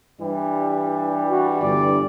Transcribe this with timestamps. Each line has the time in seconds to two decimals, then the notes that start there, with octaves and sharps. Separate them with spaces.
0.21 G2 E3 G3
1.30 F#4
1.62 G1 D3 D5